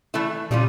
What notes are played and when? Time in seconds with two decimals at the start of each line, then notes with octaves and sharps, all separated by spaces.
0.14 E3 A3 E4
0.51 A#2 C#3 G3 C#4 F4